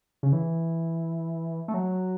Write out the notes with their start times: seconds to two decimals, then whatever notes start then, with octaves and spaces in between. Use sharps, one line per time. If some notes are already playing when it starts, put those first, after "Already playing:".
0.23 C#3
0.33 E3
1.68 A3
1.74 F#3